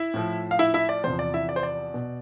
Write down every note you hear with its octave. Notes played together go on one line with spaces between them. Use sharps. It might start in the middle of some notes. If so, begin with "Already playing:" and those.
Already playing: E4 E5
A2 F3
F5
E4 E5
E4 E5
D5
E2 C3 F3 C5
D5
E4 E5
D5
C5
D5
B2